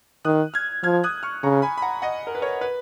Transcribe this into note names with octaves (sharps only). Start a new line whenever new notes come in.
D#3 D#6 F#6
F6 G#6
F3 F6 G#6
D#6 F#6
C#6 F6
C#3 A#5 C#6
G#5 B5
B5
F#5 A#5
D#5 F#5
A#4
B4
A#4 C#5
B4